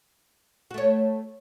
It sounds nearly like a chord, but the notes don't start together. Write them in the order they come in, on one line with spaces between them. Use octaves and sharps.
F#4 A3 C#5